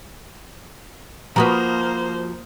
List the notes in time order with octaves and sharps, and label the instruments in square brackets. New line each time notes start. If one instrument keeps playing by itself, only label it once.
[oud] F3 F#4 B4 [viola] A#3 C5 [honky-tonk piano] A#5 D#6 F6